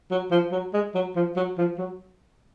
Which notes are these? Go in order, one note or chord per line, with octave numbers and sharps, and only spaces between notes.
F#3
F3
F#3
G#3
F#3
F3
F#3
F3
F#3